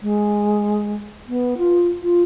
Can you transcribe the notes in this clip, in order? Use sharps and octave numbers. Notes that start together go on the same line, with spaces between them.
G#3
B3
F4
F4